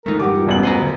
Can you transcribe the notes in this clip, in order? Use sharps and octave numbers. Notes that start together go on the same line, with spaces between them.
E3 G#3 A3 D#4 A#4
D2 G2 G4 A#4 F#5 D6
F4 F#4
E1 A1 B3 F#7
C5 G#5 A#5
D3 F#3